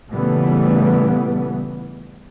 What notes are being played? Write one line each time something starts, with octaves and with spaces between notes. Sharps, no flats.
A#2 C#3 E3 G3 A3 B3